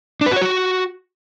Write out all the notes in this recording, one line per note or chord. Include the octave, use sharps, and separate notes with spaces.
D4
B4
F#4
C#5
F#4